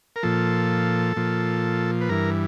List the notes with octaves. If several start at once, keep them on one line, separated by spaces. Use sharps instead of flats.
A#4
A#2 F3 A4
A#2 F3
B4
G2 E3 A#4